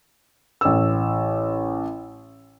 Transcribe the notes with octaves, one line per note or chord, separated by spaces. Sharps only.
A1 E6